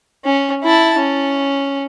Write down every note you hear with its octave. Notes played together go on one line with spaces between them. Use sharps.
C#4
E4 A5
C#4